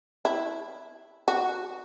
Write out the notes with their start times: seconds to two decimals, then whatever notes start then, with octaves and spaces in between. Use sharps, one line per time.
0.25 E4
1.28 F#4